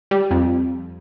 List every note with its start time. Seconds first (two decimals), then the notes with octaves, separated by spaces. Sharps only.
0.11 G3
0.31 F2